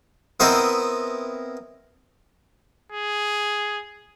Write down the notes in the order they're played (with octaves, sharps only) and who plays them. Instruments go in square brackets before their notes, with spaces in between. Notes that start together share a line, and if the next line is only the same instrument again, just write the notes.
[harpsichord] B3 C4 E4 A#4 C5 D#5
[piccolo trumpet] G#4